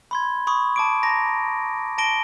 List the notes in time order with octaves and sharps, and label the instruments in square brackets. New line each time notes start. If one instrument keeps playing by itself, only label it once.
[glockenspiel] B5 C6 G#6
B5 C#6 D#6
A5 D6 D7
A5 A#5 A#6
A5 A#6 D7 G7